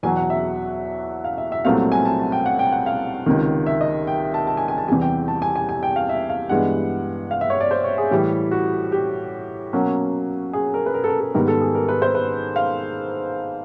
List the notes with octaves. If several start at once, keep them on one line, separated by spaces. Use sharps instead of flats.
E2 B2 F#3 G#5
F#5
E5
F5
E5
E5
C2 A#2 F#3 A3 C4 F5
G#5
A5
A5
G5
F#5
G5
F#5
F5
C#2 C3 D#3
E5
D#5
G5
A5
A5
G#5
G#5
A5
E2 C3 E3 G3 G#5
G5
A5
G#5
G#5
G#5
G5
F5
E5
F5
G2 E3 G#3 B3 F#5
F5
E5
C#5
D5
C5
C#5
G#4
A2 E3 G3 G4
F#4
G4
B2 F#3 A#3 C#4
G#4
A#4
B4
A#4
A4
A#4
A4
G#2 D#3 G3 B3 A#4
A4
G#4
A#4
B4
C5
B4
F5